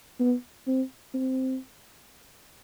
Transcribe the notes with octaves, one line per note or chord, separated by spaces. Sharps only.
B3
C4
C4